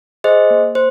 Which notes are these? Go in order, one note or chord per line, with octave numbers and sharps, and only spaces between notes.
G#4 C5 D#5
A#3
C5